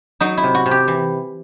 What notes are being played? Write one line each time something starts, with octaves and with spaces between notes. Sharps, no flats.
F#3 D#4
E4
C3
F#4
C3
G4
E3